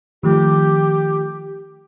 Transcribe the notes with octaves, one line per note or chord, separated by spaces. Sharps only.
D#3 F3 A3 G4